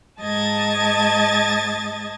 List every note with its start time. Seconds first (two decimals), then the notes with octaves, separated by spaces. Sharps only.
0.21 G#2 D#5 A5 G#6 A6